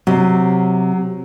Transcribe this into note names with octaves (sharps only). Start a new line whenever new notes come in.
C3 F#3